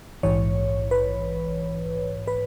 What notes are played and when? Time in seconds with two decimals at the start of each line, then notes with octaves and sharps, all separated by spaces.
0.23 A#1 G#2 E3 C#5
0.91 B4
2.27 B4